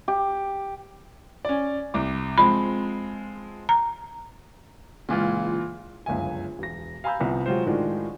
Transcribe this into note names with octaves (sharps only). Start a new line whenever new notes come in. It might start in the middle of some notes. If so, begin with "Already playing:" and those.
G4
C#4 D5
C2 D6
F3 G#3 C4 B5
A#5
C#2 A#2 E3 F4
G1 C#2 F#2 E5 G#5
E1 A#6
F5 G#5 A#5 B5 E6 G6
C2 C3 F3 B3
F#3 G#3 F4 G4 C5
A2 D#3 G#3 D4 F4 F#4